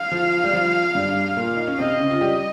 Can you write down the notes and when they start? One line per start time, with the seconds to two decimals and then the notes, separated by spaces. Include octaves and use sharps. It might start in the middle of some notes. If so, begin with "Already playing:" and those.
Already playing: F5
0.12 F3
0.44 G3
0.53 F3
0.95 G2 G3
1.36 A#2 A#3
1.56 D#4
1.67 C#4
1.79 C3 C4 D#5
1.93 C4
2.00 C#3 C#4
2.11 F4
2.21 G3 G4